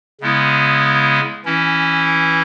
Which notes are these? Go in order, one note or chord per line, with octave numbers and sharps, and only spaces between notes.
C#3 G#3 B3 E4
E3 C#4 E4